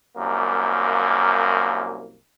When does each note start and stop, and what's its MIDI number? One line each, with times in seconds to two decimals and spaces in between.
0.16 2.15 36
0.16 2.15 42
0.16 2.15 58